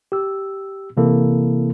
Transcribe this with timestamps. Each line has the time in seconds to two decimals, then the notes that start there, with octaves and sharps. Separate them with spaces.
0.12 G4 E6
0.97 C3 E3 A#3 E4 A4